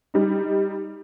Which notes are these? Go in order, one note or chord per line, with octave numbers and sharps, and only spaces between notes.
G3 D#4